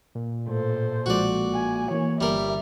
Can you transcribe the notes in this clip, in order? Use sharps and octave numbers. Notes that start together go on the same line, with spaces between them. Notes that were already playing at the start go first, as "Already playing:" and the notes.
A#2
A2 A4 C5
B1 F3 G#3 F#4 D5
G#5
E3 A#3 C#5
G1 G3 A#4 E5